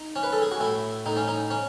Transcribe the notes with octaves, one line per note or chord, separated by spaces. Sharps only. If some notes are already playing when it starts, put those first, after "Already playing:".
Already playing: D#4
C#4
B4
A4
G#4
F#4
A2 E4
A2 D#4
C#4
D#4
C#4